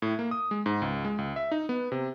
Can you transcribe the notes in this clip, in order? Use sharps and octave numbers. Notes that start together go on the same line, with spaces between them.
A2
A#3
D#6
G#3
G#2
C#2
G#3
C#2
E5
D#4
B3
C3